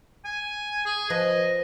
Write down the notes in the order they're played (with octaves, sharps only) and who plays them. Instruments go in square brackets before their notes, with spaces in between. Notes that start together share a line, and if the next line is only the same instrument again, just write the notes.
[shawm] G#5
G#4
[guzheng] F3 B4 [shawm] D#5